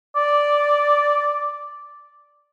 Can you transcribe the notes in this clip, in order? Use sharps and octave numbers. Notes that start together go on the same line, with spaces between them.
D5